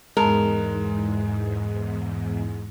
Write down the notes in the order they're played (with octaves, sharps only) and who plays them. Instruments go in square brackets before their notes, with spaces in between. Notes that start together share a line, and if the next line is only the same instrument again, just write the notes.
[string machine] E2 G#2 [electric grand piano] G#3 [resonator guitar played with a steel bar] A#4